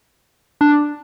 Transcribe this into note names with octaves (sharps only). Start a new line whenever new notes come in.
D4